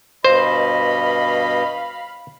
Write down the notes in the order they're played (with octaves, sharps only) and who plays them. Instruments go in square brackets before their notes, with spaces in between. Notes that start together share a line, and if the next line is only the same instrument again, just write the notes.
[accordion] G2 B2 D#5 [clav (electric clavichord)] C5 [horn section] F5 B5